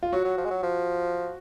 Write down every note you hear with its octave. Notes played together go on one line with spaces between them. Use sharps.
F4
F#3 F#4
F#3
F3
G#3
F#3
F3